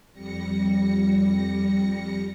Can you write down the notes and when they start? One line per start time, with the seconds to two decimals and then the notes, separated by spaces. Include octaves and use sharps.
0.13 F2 G3 A#6 C#7